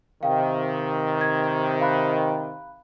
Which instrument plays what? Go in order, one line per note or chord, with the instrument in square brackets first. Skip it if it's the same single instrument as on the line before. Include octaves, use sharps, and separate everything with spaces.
[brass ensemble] C3 D#3 [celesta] F5 G5
[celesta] G#6
F5 B5 F#6